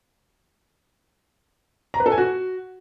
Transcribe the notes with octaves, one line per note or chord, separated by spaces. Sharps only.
A#5
B4
A4
G#5
F#4